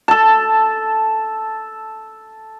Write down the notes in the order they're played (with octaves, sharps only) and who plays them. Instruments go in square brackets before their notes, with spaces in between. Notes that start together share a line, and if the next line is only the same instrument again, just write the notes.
[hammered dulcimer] A4 A5